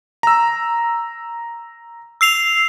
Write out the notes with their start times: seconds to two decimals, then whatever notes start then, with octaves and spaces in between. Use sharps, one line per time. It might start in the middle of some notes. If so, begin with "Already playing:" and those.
0.23 A#5 E6
2.21 E6 C7 F7